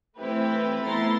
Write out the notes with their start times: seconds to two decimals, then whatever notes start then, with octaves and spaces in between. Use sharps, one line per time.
0.18 E3 A3 C4 E4 G4 B4
0.84 A3 B3 E4 A#5 C6 A6